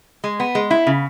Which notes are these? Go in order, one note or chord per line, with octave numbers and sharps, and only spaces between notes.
G#3
B3
G#3
E4
C#3